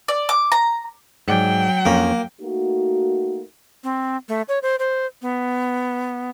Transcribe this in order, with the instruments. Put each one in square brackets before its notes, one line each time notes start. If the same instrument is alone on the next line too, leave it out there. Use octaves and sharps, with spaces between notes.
[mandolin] D5
D6
A#5
[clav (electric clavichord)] G#2 D5 G#5 [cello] F#3 G5
[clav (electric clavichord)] F2 C#4 [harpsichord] A#3
[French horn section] A3 A#3 D#4 F#4
[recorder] C4
A3
C#5
C5
C5
B3